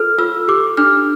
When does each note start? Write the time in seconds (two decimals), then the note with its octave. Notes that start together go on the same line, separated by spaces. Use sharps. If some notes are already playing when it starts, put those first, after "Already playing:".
Already playing: F4 A4 F6
0.18 F4 E6
0.48 G4 D6
0.77 D4 F6